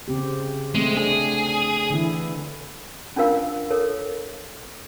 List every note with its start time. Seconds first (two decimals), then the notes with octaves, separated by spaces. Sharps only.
0.08 C#3 C4 G4
0.75 G#3 A3 C4
0.97 D4 G#4
1.90 D3 E3 E4
3.16 C#4 D4 F4 A#4 F5 E6
3.70 A4 A#4 C#5